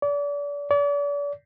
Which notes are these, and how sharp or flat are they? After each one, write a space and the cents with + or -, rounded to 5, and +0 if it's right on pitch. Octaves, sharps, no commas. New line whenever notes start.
D5 -35
D5 -40